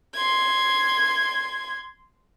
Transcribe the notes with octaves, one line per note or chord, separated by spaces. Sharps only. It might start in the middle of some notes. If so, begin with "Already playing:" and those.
C6 G#6